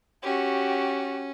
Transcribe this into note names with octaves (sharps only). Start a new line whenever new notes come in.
C#4 F#4 G4